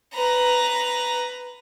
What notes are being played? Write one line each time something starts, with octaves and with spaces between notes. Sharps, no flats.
B4 A#5